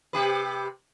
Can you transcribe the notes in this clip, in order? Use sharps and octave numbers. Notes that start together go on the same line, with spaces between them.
C3 G4 B4